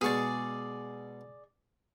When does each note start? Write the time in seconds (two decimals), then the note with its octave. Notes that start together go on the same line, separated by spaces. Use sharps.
0.01 B2 G#3 G#4 D5 C#6